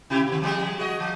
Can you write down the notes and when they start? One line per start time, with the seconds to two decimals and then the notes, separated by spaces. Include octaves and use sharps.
0.10 C3 E4 G4
0.28 B2 D#3
0.42 F3 G3 G#3
0.78 F#4 G#4 D#5
1.00 F3